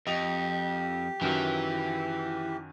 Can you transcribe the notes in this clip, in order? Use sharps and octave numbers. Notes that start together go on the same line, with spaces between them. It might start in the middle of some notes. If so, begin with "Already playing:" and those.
F2 G4 D#5 F7
F#2 D#3 E3 F#3